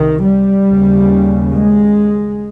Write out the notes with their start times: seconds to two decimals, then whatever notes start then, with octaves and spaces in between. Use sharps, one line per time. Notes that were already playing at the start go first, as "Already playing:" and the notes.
Already playing: C2 C3 D#3
0.24 G3
0.67 D#2 C#3
1.51 G#3